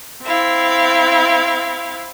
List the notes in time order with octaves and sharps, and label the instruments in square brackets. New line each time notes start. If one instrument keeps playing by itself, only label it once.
[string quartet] C4 E4 F5